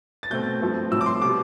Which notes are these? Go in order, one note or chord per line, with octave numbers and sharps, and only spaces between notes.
A6
B2 A3 C4 G6
G2 F3 A3 C4
A2 F3 C4 E6
D6
C6
B2 G3 B3 D6